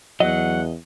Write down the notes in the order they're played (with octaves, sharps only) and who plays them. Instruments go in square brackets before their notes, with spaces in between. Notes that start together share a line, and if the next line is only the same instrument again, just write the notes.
[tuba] E2 [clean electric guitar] F#3 [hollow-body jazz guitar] D#5 [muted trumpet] F#5